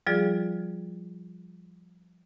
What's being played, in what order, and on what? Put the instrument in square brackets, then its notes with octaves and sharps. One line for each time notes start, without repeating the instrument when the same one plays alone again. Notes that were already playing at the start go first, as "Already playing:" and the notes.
[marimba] F3 G3 F4 G#4 D5